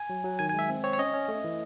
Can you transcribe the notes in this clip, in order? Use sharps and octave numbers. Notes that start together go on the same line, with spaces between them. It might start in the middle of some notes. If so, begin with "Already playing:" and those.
Already playing: G#5
F#3
F#3
D#3 G#5
G#5
G#3 E5
C4
C4 C#5
C#5
C#4 D#5
C#4
A3
E3